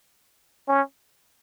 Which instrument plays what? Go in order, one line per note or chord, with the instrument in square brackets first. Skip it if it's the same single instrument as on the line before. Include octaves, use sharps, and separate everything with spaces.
[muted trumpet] C#4